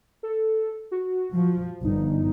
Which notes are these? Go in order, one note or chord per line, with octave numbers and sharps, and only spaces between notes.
A4
F#4
F3
G1 D#4